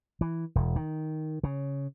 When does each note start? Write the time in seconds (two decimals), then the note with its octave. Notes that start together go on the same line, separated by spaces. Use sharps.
0.21 E3
0.55 E1
0.76 D#3
1.44 C#3